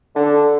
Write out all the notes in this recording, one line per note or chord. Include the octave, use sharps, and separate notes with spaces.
D3